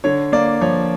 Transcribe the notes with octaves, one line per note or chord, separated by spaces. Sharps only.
D3 C#5
A#3 D5
F3 C#5